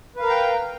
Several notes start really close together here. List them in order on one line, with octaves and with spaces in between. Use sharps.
B4 F5 A#4 A#5 G5